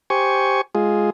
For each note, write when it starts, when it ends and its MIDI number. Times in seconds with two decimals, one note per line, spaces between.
0.10 0.61 67
0.10 0.61 72
0.10 0.61 80
0.10 0.61 85
0.75 1.10 56
0.75 1.10 65
0.75 1.10 68